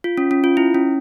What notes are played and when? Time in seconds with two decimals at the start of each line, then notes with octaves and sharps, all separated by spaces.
0.04 F4
0.18 C#4
0.31 C#4
0.44 F4
0.57 E4
0.75 C#4